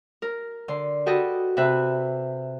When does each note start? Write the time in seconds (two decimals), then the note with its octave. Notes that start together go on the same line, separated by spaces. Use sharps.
0.22 A#4
0.68 D3 C6
1.06 F#4 G4 A4 B4 D#5
1.57 C3 B4 E5 F#6